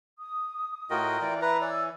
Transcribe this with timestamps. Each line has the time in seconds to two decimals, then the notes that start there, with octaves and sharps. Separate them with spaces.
0.18 D#6
0.90 A2 F4 F#4 A#4 D#5 G5
1.21 E3 D5
1.42 B4 E5 A#5
1.61 C#5 D5 G#5 E6